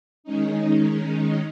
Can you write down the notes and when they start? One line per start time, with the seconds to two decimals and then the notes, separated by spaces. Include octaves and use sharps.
0.24 D#3 G#3 C#4 D#4